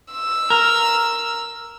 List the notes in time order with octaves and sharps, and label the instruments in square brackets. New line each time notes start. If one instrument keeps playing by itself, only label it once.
[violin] E6
[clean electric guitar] A#4